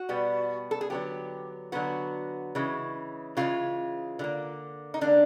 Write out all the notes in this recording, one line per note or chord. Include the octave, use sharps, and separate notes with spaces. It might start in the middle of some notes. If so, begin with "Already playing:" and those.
Already playing: F#4
B2 G3 B3
A4
G#4
D3 F#3 B3 G4
D3 F#3 B3 F#4
C#3 E3 G#3
C#3 E3 G#3 F4
D3 G3 A#3
D#4
D3 G3 A#3 D4